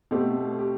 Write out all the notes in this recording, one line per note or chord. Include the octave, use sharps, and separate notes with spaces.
B2 A3 C4 G4
G4